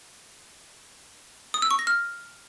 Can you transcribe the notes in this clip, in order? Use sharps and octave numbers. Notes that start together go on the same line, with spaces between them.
D#6
E6
C#6
A#6
F6